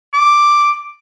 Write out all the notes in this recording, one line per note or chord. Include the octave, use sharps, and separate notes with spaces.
D6